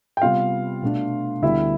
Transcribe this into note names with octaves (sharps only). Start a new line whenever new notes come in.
G5
C3 G3 B3 F4 F5
B2 A3 D4
D2 D3 G3 B3 E4 E5